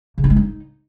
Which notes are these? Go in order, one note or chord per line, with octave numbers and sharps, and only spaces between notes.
C#3
D#4
G#3
D#4